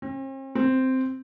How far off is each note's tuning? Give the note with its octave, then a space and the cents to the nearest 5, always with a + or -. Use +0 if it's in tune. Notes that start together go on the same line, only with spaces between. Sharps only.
C4 +45
C4 -5